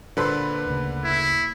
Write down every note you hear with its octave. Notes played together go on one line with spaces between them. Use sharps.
A#2 D3 A4 B4 C5
D2 C#3
E4